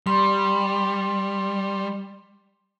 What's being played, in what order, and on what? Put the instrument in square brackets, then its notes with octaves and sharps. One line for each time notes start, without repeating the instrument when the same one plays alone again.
[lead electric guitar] G3 [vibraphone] C6